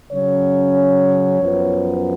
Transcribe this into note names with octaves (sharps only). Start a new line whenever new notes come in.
C#3 F#3 C#4 C#5
F#2 F3 B3